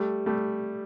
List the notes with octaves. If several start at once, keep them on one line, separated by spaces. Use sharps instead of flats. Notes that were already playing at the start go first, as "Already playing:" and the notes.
Already playing: G3 A3
G3 A3